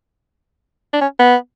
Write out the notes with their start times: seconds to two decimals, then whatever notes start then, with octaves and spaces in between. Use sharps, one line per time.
0.93 D4
1.01 C#4
1.19 B3